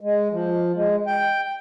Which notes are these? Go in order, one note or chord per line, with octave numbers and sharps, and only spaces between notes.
G#3
F3
G#3
G5